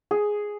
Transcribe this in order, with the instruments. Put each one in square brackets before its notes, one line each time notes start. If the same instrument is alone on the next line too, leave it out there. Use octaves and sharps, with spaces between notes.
[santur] G#4